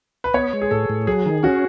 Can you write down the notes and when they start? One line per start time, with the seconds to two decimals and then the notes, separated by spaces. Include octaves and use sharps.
0.24 B4
0.34 B3 C#5
0.53 G#3
0.62 G#4
0.71 A2 A4
0.90 A2
1.07 F#3 G#4
1.26 D#3
1.43 C#4 F#4